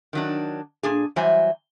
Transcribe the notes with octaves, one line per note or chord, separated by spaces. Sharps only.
D#3 F#3 D4
A#2 D4 G#4
E3 F#3 G3 C5 E5 G#5